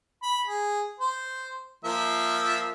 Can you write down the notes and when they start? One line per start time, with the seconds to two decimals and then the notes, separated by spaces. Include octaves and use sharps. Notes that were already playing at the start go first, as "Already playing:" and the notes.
0.23 B5
0.46 G#4
1.00 C5
1.84 F3 A#3 E5